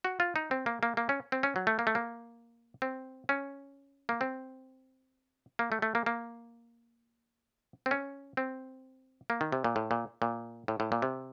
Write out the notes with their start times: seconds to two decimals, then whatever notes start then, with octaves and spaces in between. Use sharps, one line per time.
0.04 F#4
0.20 F4
0.36 D#4
0.51 C4
0.66 A#3
0.83 A#3
0.97 A#3
1.09 C#4
1.32 C4
1.43 C#4
1.56 F#3
1.67 A3
1.79 A#3
1.87 A3
1.95 A#3
2.82 C4
3.29 C#4
4.09 A#3
4.21 C4
5.59 A#3
5.72 A3
5.82 A3
5.95 A#3
6.06 A#3
7.86 C4
7.91 C#4
8.37 C4
9.30 A#3
9.41 D#3
9.52 C3
9.64 A#2
9.76 A2
9.91 A#2
10.22 A#2
10.68 A2
10.80 A2
10.92 A#2
11.02 C3